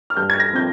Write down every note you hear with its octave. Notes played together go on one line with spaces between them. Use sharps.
F6
G2 G6
G#6
A#6
F3 C4 G6